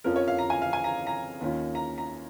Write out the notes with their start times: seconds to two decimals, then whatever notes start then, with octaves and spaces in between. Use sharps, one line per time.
0.04 F2 F3 C#4 F4 A#4
0.16 C#5
0.28 F5
0.38 A#5
0.50 G#5
0.62 F5
0.73 G#5
0.84 A#5
1.07 A#5
1.41 D#2 D#3 C#4 F4
1.75 A#5
1.98 A#5